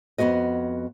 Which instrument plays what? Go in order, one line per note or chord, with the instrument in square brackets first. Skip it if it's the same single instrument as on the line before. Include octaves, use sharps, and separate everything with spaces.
[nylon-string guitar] F2 C3 B3 F#4 D#5